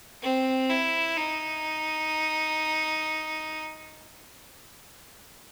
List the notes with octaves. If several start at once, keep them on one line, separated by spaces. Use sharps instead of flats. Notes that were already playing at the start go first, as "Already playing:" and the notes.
C4
E4
D#4